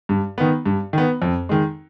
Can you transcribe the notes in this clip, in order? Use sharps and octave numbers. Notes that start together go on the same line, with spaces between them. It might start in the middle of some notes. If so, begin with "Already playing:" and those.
G2
D#3 B3
G2
D#3 B3
F2
D#3 G#3